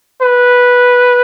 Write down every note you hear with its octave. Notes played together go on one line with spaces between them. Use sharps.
B4